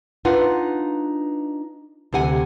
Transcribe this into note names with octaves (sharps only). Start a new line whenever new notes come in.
D4 D#4 F4 B4 F#5
D2 C3 G4 F#5 G#5